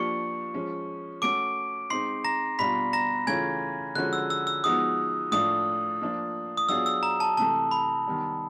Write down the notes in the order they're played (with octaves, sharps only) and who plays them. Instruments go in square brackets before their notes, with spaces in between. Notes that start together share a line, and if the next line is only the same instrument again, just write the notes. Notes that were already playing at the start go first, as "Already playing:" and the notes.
Already playing: [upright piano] F3 A#3 D4 G4 [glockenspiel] C#6 C#7
[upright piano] F3 G#3 C#4
[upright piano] A3 C#4 F#4 A4 [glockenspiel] D6 D7
[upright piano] G#3 C4 D#4 [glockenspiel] C6 C7
[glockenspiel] A#5 A#6
[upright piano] B2 G3 B3 D4 F4 [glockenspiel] B5 B6
[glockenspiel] A#5 A#6
[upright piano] C#3 E3 A3 C#4 F4 [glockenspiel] G#5 G#6
[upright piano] D3 F3 G#3 C#4 F#4 [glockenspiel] F#6
[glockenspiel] E6
E6
E6
[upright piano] F3 G#3 B3 D#4 F#4 [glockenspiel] D#6
[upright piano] A2 F3 A3 D4 F4 [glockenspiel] D#6
[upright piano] F3 A#3 D4 F4
[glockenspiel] D#6
[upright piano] F#3 B3 D4 F4 G#4 [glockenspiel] E6
[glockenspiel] E6
A#5
A5
[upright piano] C3 E3 A3 [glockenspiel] A5
[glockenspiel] B5
[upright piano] D#3 G3 B3